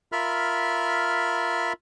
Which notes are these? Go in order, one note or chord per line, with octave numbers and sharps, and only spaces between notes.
F4 A#4 E5 B5 F6